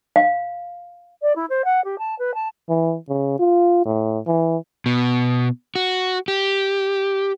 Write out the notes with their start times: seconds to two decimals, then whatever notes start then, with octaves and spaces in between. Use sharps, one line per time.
0.16 F5
1.22 D5
1.35 E4
1.50 C5
1.65 F#5
1.84 G4
1.99 A5
2.19 B4
2.34 A5
2.69 E3
3.09 C#3
3.39 F4
3.85 A2
4.27 E3
4.86 B2
5.75 F#4
6.28 G4